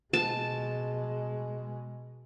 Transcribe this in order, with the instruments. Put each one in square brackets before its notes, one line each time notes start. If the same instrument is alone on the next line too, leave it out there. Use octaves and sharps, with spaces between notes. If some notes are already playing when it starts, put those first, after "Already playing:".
[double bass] B2 G#3 [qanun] A5